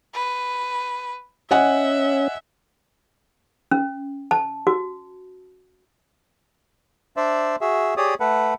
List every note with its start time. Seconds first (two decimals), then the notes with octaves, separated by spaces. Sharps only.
0.14 B4
1.51 C#4 D#5 E5 F#5 G#5
3.71 C#4
4.31 A5
4.67 F#4
7.17 D4 C5 D5 E5
7.61 F#4 G#4 E5
7.97 G4 G#4 C#5 D5 D#6
8.20 A3 A4 B4 F#5